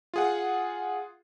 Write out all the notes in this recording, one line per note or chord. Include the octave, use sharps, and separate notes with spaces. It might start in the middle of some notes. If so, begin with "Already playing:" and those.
F4 G#4 F#5